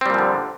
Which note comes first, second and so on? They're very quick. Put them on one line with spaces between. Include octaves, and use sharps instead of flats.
C4 G3 A#2 F3 D3